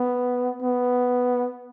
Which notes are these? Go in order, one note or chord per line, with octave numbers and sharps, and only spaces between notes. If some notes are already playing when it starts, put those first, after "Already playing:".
Already playing: B3
B3